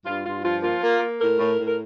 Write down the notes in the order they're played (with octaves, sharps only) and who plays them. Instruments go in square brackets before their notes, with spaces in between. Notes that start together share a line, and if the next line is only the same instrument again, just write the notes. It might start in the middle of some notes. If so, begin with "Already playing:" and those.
[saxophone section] G2 F4
G2 F4
F3 F4
A#3 F4
A#3
A#3
A2 A#4
A2
A2
A#4